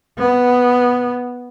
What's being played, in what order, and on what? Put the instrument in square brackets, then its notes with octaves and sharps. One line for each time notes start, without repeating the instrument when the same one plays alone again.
[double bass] B3